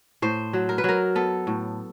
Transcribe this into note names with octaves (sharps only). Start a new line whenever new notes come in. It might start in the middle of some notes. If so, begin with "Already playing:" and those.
A2 C5
F#3
A#4
B4
F#3 A#4
B3 A4
A2